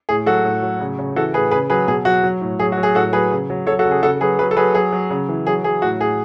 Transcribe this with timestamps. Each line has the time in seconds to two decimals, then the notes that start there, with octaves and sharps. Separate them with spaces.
0.09 A2 G#4
0.26 F#3 F#4 A4
0.45 A2
0.62 F#3
0.80 C#3
0.98 C#3
1.16 E3 F#4 A4
1.34 A2 G#4 B4
1.51 C#3 G#4 B4
1.70 F#3 G#4 B4
1.88 B2 G#4
2.05 F#3 F#4
2.24 F#3
2.41 A2
2.59 F#3 G#4
2.72 F#4
2.77 F#3
2.83 G#4
2.95 A2 F#4 A4
3.13 F#3 G#4 B4
3.31 C#3
3.50 F#3
3.67 F#3 A4 C#5
3.79 F#4 A4
3.85 C#3
3.91 G#4
4.03 C#3 F#4 A4
4.21 F#3 G#4 B4
4.39 F#3 G#4 B4
4.51 A4
4.57 F#3 G#4 B4
4.75 F#3 G#4
4.92 F#3
5.10 C#3
5.29 E3
5.47 F#3 G#4
5.64 F#3 G#4
5.82 A2 F#4
6.00 A2 G#4